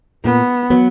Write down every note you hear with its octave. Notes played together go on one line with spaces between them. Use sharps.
A#2 B3
F#3 B3